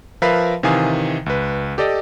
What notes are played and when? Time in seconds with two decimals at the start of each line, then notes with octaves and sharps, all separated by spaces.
0.22 F3 A#4 B4 E5 F5 B5
0.63 C3 D#3 E3 F5 G#5 D#6
1.26 C#2 B4
1.78 G4 A4 D5 D#5